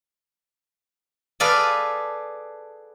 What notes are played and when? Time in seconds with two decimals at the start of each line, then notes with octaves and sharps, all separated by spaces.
1.40 G#4 A4 B4 D5 F5